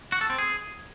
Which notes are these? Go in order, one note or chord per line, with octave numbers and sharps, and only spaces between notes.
F#4
A4
C4
G#4